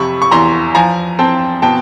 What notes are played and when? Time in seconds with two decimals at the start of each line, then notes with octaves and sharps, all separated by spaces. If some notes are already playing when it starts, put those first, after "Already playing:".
Already playing: F2 C3 B5 C#6
0.22 C#6
0.31 E2 A#5 C6
0.75 F3 G#5 A#5
1.19 C4 G5 A5
1.62 B2 G5 A5